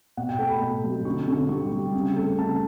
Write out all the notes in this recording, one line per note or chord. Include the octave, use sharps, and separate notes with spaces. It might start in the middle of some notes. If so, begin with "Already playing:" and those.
B2 F#5
G5
A3 A5
B5
B2
F#3
D3 C#6
D3
G3 C#6
G3
C#3
A3
C#3 A5